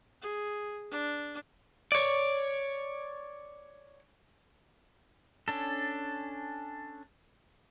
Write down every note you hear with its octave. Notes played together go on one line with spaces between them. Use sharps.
G#4
D4
C#5 D5
C#4 D4 A4